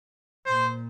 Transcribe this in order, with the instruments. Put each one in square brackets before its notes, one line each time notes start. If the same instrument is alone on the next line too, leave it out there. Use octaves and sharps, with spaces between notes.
[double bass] A#2 [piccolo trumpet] C5